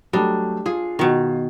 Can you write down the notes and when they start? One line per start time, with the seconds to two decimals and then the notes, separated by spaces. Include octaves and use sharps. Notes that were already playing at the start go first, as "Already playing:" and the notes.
0.13 F#3 G3 A3 D4 D#5
0.66 F4 G#4
0.99 B2 D#3